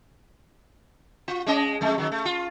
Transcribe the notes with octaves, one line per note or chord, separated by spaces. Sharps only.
F4
G#3 C#4 D#5
F2 G#3 A3
D#3 F#3
A3
F4